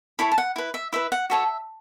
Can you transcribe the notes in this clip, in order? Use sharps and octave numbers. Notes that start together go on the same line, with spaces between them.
E4 A4 C#5 B5
A5
F#5
E4 B4
E5
E4 B4 E5
F#5
F#4 A4 C#5 E5